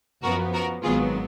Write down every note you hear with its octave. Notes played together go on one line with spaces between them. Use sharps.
F#2 F3 B3 F#4 A#4
F#4 A#4
G#1 G#2 D#3 F#3 B3 F4 G#4